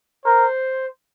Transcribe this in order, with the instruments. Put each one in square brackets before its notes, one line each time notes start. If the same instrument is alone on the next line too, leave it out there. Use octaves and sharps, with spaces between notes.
[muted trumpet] A#4 [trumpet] C5